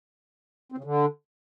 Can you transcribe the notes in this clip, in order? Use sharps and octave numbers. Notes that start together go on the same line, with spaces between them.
C4
C#3
D3